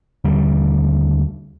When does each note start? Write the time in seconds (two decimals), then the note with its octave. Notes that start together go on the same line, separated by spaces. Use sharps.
0.24 D#2 D3 G3